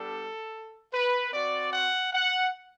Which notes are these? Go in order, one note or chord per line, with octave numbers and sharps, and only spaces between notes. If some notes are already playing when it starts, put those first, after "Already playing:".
Already playing: G3 B3 D4 G4 A4
B4
C4 F#4 D5
F#5
F#5